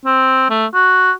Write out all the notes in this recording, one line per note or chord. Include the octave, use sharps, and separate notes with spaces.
C4
A3
F#4